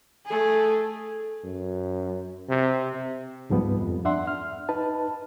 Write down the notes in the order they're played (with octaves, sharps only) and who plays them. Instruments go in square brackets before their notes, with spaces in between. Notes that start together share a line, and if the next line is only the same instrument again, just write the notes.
[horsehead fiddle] A3 G#4
[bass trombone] F#2
C3
[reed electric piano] C#2 G#2 F3 G3 B3
F2
D4 E5 F#5 C6
F6
D#4 B4 A5